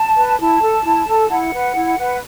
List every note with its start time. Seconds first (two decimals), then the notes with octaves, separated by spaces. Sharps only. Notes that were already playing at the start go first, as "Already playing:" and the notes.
Already playing: A5
0.16 B4
0.40 E4 A5
0.62 A4
0.84 E4
1.07 A4
1.29 E4 F#5
1.53 B4
1.75 E4
1.97 B4